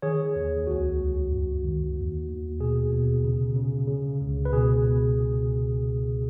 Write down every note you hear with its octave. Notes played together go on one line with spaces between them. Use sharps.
D#3 G#4 C#5
D#2
C#2 F#4
C#2
F#2
D#3
D#2
D#2
B2 G#4
B2
C#3
C#3
C#3
C#2
B4
B2 G#4
B2